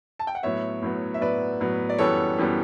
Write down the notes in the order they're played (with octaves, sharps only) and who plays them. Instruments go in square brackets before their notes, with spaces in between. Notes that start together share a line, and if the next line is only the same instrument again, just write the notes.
[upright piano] A5
G5
F#5
A2 F#3 B3 C#5 E5
A2 F#3 B3
E5
A2 F#3 B3 B4 D5
A2 F#3 B3
D5
F#2 E3 G3 B3 A4 C#5
F#2 E3 G3 B3